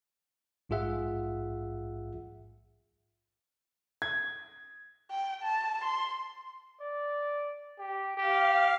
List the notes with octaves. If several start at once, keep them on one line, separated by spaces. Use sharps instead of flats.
A#1 G#2 F4 G#4 E5 F#5
G#6
G5
A5
C6
D5
G4
G4 F5